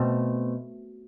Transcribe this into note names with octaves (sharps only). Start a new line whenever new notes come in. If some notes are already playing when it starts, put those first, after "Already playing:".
Already playing: B2 A3 C4